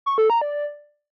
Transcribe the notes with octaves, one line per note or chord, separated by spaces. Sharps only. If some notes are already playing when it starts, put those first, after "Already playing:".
C#6
A4
A#5
D5